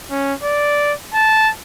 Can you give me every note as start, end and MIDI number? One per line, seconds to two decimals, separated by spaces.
0.11 0.34 61
0.44 0.93 74
1.14 1.50 81